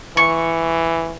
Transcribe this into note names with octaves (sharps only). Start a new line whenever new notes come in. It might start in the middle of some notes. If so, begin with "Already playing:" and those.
E3 C#6